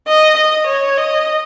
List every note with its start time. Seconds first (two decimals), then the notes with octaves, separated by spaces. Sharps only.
0.08 D#5
0.38 D#5
0.67 C#5
0.97 D#5